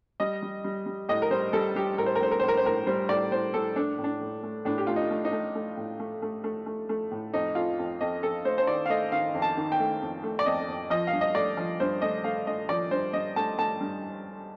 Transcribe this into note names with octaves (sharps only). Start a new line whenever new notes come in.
G3 D#5
G3
G3
G3
A2 D#5
A#4
G3 C5
G3 A4
G3 G4
A2 A#4
C5
A#4
A2 C5
A#4
C5
A2
A#4
C5
A2 A#4
G3 C5
A2 D5
A2 C5
A2 A4
A3 D4
A2
D4
A2
A3
A2 D4
G4
A3 F4
D#4
A3
D#4
A3
A3
A2
A3
A3
A3
A3
A3
A2
F2 D#4
F2 F4
F2
F2 D#5
F2 A4
A3 C5
C5
D#3 D5
F5
A3 D#5
D#3 F5
F2
A5
D#3
G5
A3
F2
A3
D5
F2 D#5
F2
F3 D#5
F5
G2
D#5
A3 D5
F3
G2 C5
A3 D#5
A3 F5
A3 D#5
F3 D5
G2 C5
G2 D#5
A3 A5
A3 A5
G2